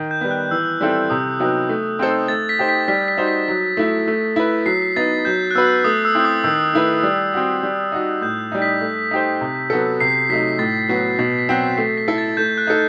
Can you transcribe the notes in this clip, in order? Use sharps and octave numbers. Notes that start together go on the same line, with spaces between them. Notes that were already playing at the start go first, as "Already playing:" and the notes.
Already playing: D#3
G6
G3 B3
F#6
E3 E6
G3 C4 E4 A4
C3 D#6
F#3 B3 D#4 G4
A3
C4 D#4 A4 C5
A3 A6
B6
D#4 G4 C5
B6
G3 B6
B6
D#4 F#4 C5
B6
F#3
A3 E4
A3
E4 B4
F#3 C7
B6
B3 D#4 A6
F#3 G6
F#6
B3 F#4 B4 E6
A3 D#6
E6
C4 E4
D#6
D#3 E6
A3 E4 B4
G3
C4 F#4
G3
D#4 F#4
A2 G6
G3 D#4
B6
A3
D#4 G4 C5
C3
F#3 B3 F#4 A4
C3 C7
F#3 A3 D#4 B6
A2 A6
F#3 B3 F#4
B2 A6
B6
F#3 C4 F#4
C7
A3 C7
B6
E4 A4
A6
A3 G6
F#6
D#4 A4